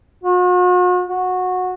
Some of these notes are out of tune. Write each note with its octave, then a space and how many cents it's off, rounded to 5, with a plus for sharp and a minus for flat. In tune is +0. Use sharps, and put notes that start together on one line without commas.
F#4 -45
F#4 -15